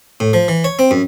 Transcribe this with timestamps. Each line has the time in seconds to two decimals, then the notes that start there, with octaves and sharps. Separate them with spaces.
0.20 A2
0.33 F3
0.48 E3
0.64 C#5
0.79 C4
0.91 F#2